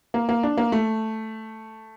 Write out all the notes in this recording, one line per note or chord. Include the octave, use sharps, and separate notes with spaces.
A#3
A#3
D4
A#3
A3